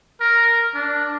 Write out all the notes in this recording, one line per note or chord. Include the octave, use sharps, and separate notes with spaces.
A#4
D4